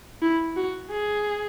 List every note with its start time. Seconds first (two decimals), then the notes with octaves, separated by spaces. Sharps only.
0.22 E4
0.56 F#4
0.91 G#4